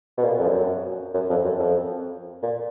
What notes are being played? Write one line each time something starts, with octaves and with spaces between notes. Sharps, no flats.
B2
A#2
F2
F#2
F#2
F2
F#2
F2
A#2